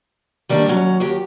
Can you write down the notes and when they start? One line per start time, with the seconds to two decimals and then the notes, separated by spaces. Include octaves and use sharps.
0.49 D#3 G3 A#3 C4 D4
0.67 D#2 F#3 C#4
1.00 D#2 F#3 G4